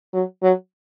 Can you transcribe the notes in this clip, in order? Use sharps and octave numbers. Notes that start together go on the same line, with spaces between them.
F#3
F#3